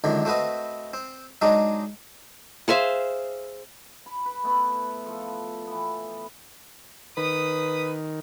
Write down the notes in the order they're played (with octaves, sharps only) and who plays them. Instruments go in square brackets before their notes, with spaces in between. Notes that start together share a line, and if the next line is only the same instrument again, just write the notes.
[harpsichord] C#2 F#2 D3 D#3
A3 C4 F#4 B4 D#5
C4
F#3 G#3 D4 D#4
[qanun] G#4 C5 E5 F5
[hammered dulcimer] B5
B4
A3 B3 E4 B4
F3 A4
E3 B3
[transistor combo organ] D#3 [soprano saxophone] B4 [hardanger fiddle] D#6